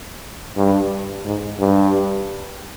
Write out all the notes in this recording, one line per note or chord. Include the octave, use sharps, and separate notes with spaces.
G2
G#2
G2